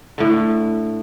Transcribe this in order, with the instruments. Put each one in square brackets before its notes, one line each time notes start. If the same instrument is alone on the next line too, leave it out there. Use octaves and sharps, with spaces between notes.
[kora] A2 D3